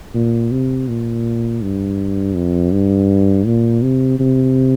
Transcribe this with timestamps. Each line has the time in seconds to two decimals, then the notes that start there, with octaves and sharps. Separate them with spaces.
0.14 A#2
0.52 C3
0.88 A#2
1.62 G2
2.35 F2
2.72 G2
3.46 A#2
3.82 C3
4.19 C3